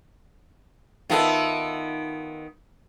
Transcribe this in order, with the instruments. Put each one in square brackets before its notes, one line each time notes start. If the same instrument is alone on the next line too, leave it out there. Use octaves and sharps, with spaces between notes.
[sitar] D#3 B3 [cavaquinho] F4 A4 E5